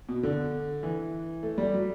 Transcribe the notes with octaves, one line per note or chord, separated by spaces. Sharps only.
B2
D3
E3
A3
G3
F#3